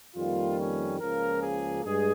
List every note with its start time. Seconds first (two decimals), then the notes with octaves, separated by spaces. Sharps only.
0.15 F2 D#3 G3 A#3 F4
0.57 C#4
0.99 C#2 C#3 F3 A#3 A#4
1.41 G#4
1.83 G2 G#3 G#4